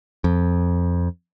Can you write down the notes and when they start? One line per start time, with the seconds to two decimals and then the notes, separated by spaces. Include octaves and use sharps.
0.24 F2